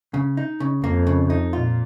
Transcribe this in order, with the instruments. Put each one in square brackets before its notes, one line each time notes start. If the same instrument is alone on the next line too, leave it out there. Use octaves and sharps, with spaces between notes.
[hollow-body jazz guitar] C#3
D#4
C#3
[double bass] F2 [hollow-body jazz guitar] A#3
[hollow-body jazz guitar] C#3
D#4
[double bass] A#2 [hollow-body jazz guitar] F4